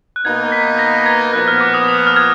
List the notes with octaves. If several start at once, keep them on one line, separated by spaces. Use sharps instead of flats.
F#6
B2 A#3 D#4 G#6
B6
A#6
G#6
A#2 F3 B3 F#6
F6
D6
D#6
D#6
F6
G#6